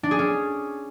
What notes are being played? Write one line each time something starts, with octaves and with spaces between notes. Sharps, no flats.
D4
G#4
C#4